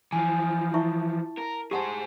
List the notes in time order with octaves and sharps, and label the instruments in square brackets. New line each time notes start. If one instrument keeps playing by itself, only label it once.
[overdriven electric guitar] E3 F3 [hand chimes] G#5
[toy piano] E4 E5 C#6 [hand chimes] A5
[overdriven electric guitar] A#4
[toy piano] G4 F#5 A5 [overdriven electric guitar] G#4 C5